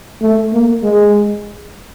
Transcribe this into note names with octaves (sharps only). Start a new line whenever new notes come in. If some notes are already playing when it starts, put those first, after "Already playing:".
A3
A#3
G#3